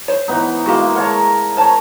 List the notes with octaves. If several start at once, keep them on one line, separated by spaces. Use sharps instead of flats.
C5 C#5
E3 B3 D#4
G#3 A#3 F#4 G4
A#4 C#5 F#5 A5
A#4 C5 C#5 A5